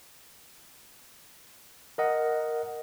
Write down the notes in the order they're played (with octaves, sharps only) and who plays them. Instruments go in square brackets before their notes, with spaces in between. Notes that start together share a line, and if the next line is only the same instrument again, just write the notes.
[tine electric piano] A#4 D#5 F#5